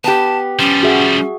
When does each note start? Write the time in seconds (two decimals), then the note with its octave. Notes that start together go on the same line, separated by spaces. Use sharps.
0.04 B3 G4 A5
0.59 F3 G3 C#4
0.83 F#4 G#4 E5